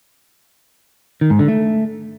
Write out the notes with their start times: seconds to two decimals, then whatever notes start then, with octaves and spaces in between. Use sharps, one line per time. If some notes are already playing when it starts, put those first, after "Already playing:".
1.21 D#3
1.30 G#2
1.39 D3
1.48 A3